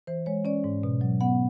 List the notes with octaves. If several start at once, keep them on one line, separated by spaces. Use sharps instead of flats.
E3 C5
G#3 C#5
C#4 D5
G#2
B2
F#3
B3 F#5